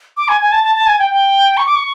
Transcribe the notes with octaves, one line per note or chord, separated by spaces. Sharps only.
D6
G#5
G#5
A5
A5
A5
G#5
G5
G5
C#6
D6
C#6